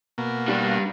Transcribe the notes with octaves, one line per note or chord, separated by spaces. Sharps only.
B2 A#3
G3 D4